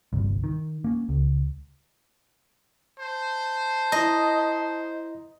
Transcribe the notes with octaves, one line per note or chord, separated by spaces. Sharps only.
G1 C2
D#3
A#3 C#4
C#2
C5 A5
E4 D#5 A#5